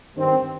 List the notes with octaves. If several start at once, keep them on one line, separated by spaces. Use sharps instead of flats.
G2 D#3 G3 C4